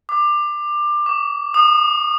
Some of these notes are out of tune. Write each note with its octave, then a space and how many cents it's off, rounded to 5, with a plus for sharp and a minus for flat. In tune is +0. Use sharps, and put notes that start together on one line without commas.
D6 +20
D6 -40
D#6 -35